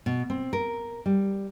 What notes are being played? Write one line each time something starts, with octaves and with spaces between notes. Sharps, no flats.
B2
C4
A#4
G3